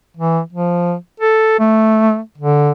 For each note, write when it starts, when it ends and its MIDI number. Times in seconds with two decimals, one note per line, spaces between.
0.17 0.41 52
0.53 0.95 53
1.20 1.57 69
1.60 2.19 57
2.38 2.72 50